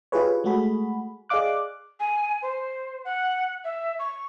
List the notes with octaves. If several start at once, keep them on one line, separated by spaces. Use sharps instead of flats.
E4 F4 G4 G#4 B4 C#5
G#3 A3 F#4 G#4 B5
G#4 D5 D#5 F5 D6 F#6
G#5
C5
F#5
E5
C#6